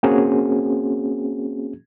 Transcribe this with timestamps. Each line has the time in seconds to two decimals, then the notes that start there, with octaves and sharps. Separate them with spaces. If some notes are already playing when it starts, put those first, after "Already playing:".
0.03 A#3 C4 C#4 F#4 G#4